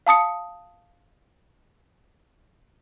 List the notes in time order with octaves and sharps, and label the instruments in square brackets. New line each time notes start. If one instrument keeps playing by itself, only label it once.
[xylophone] F5 A5 D#6 C#7